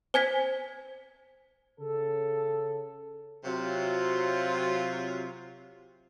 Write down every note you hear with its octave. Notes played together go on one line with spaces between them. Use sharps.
C5 G#5 G#6 B6
C#3 A4
C3 F#3 F4